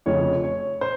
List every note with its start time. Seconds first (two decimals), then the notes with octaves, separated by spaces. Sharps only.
0.06 F1 F2 C#3 F3 C#5
0.44 C#5
0.81 C5